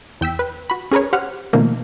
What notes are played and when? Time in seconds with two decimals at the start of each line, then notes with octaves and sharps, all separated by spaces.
0.21 E2 G5 E6 B6
0.39 B4
0.70 F#4 B5
0.91 C#4 G#4 A#4 B4 C#5
1.13 G4 C5 F#5 F6
1.53 B2 D#3 F3 A3 A#3